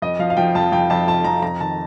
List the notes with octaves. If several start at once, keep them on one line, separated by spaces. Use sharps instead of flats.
F2 D#5
F3 F5
F5
F3 G5
F2 A5
F2 G5
F2 A5
F2 A5
F2 A#5
F2 A#5
D#3 A5